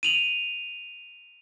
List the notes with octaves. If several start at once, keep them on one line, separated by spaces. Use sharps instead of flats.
D#7 F7 F#7